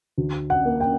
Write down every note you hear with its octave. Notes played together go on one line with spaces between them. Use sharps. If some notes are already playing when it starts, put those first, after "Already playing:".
D2
F#5
A#3
G5